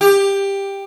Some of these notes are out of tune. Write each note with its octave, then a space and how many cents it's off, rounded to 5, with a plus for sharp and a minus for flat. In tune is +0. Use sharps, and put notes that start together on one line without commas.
G4 +10